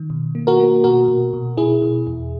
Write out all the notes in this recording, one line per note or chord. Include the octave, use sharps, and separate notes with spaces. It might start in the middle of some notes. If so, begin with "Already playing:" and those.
Already playing: D#3
B2
A#3
F#4 A#4
A#3
B2 F#4 A#4
B2
B2
B2 E4 G#4
B2
E2